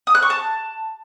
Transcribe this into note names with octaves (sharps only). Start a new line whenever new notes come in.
D#6
F#6
C#6
A5